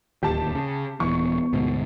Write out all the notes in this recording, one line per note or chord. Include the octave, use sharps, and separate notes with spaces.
D1 D#2 G4 A5
C#3
D#1 E3 B3 C#6
D2 G#2 B2